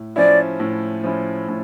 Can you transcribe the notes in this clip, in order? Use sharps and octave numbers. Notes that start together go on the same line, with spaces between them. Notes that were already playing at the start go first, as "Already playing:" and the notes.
Already playing: A2
F3 C#4 E4 D5
A2
F3 C#4 E4
A2